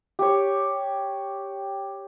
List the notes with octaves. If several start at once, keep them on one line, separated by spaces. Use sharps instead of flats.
G4 C#5